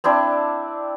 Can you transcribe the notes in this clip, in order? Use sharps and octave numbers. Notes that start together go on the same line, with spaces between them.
C4 D4 E4 D5